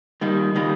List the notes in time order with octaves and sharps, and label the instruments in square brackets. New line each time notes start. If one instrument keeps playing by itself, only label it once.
[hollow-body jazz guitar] D#3 G3 A#3
D#3 G3 A#3